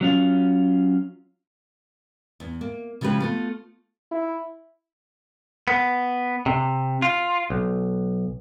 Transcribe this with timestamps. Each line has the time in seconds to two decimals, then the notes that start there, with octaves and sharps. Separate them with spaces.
0.01 F#3 C#4 F4
2.40 E2
2.61 A#3
3.01 C#3 F3 G#3 G4 B4
3.20 A3 B3 F4
4.11 E4
5.68 B3
6.46 C3
7.02 F4
7.50 B1